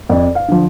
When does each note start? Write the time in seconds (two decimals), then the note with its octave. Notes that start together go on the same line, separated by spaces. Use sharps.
0.09 F2 D5
0.35 F5
0.48 D3 F3